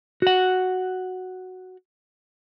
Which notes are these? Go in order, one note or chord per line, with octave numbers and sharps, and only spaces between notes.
F#4 F#5